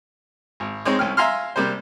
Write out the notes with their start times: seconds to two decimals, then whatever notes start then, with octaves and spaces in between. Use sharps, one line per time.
0.60 G#1
0.85 G#3 C4 D#4 C#5
0.99 C2 C#4 G5 F6
1.17 E5 F5 G#5 A#5 C6 F6
1.56 C3 G3 A#3 C5